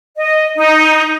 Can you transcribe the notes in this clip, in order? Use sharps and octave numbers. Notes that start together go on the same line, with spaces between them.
D#5
D#4